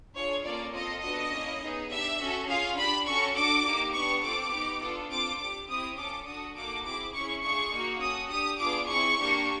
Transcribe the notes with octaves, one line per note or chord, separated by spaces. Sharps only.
D4 F4 G#4 C#5
A#3 C#4 F4 A4 D5
C4 F4 A4 D#5
B3 D4 F#4 A4 D#5
A#3 C#4 E4
B3 D#4 G#4
D4 G4 E5
C#4 F#4 A4
C#4 F4 G#4 F5
D4 G4 B5
C#4 F#4 A4 C#6
D4 F#4 A4 D6
A#3 D#4 G4
B3 D4 G4 C#6
C4 F4 A4 D6
B3 D#4 G4
B3 D4 F4 A4
C4 F4 A4 D6
D4 G4 D6
C4 E4 G4 D#6
C#4 F4 A4 D6
D4 F#4 A4 D#6
A#3 D#4 F#4 A4 D6
C4 E4 G#4 D6
C#4 E4 G#4 C#6
A3 D4 F4 G#4 C#6
A#3 D#4 F#4
C#4 F#4 A4 D#6
D4 G4 D#6
B3 D4 F4 G#4 D6
C4 E4 G#4 C#6
A#3 D4 G4